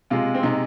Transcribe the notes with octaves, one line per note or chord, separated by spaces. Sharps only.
C3 G#3 F4
C4
C3 G#3 D#4